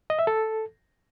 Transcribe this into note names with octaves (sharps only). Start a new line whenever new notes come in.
D#5
E5
A4